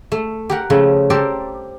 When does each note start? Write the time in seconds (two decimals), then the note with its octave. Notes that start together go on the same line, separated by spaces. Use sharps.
0.12 A3
0.50 G4 A#4 F#5
0.70 C#3 F3 A3
1.10 G4 A4 A#4 C5 D5